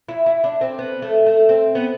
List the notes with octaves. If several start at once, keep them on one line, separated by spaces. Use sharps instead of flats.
E4
E4
D4
C4
B3
A3
A3
C4
B3